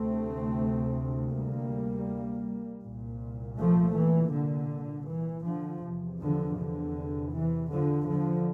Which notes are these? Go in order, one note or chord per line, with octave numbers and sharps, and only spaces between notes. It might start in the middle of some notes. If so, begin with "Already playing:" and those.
Already playing: D2 C3 A3 C4
G3 A#3
C2 A#2
F3 A3
E3
D3
E3
D3 F3
E2 C3
D3 F3
D3
E3
D3 F3
D3 F3